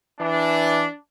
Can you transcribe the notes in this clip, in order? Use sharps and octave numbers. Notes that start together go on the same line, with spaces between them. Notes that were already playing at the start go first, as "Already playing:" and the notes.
E3 D4